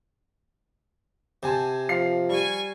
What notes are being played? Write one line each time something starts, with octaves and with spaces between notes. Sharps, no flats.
C3 C5 G#5 A5
F3 F5 C7
G3 G#5 C#6